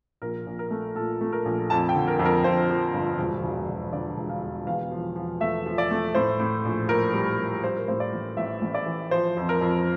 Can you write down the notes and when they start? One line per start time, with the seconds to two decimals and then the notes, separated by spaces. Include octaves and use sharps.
0.22 A#1 A#4
0.46 A#1
0.59 A#4
0.71 A3
0.95 A#2 A4
1.21 A3
1.33 A#4
1.45 A#1
1.70 F2 A5
1.89 G5
1.95 D3
2.08 A#4
2.19 F2
2.25 A#4
2.44 F2 C5
2.70 F3
2.93 G1
3.18 E1
3.43 E1
3.68 E1
3.93 D3 D5
4.17 E1
4.29 F5
4.42 E1
4.67 E2 F5
4.91 F3
5.16 F3
5.41 A3 E5
5.66 F3
5.78 D5
5.91 A3
6.15 A2 C5
6.40 A2
6.65 A#1
6.88 A#1 A#4
7.14 G3
7.39 G3
7.63 G3 C5
7.77 A#4
7.88 A2 C5
8.00 D5
8.13 A1
8.37 A1 E5
8.62 A1
8.74 D5
8.86 E3
9.11 F3 C5
9.37 F2
9.49 A#4
9.61 F2